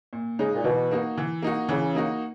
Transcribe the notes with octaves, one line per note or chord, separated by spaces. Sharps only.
A#2
C#3 G#3 D#4
A#2
B2 E3
A#3 D#4 F#4
E3
A#3 D#4 F#4
C#3 E3
A#3 D#4 F#4